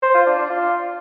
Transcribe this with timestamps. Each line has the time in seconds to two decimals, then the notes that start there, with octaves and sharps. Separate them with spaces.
0.02 C5
0.14 F4
0.26 D4
0.38 D4
0.50 F4